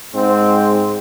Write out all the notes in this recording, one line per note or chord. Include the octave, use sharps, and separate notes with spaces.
G#2 C4